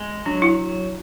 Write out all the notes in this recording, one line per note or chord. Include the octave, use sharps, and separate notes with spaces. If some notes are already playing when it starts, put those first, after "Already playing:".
Already playing: G#3
F#3 D4
E4